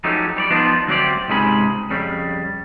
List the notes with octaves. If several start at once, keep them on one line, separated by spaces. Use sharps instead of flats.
F3 F#3 A3 C#4 D#4 G4
G3 C#5 D5
F3 B3 D4 D#4 F4
D2 F#3 C4 C#4 G4 D5
C#2 G#2 C3 G#4 B5
F2 C#3 G3